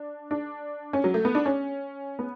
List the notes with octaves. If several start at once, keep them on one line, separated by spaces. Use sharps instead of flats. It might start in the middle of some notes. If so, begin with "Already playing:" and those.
Already playing: D4
D4
C#4
F#3
A3
B3
D4
C#4
B3